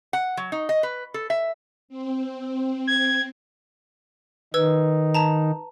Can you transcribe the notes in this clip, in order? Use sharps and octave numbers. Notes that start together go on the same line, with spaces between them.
F#5
F#3
D#4
D#5
B4
A4
E5
C4
G#6
D#3 D#4 B4 E6 G#6
A5 A#5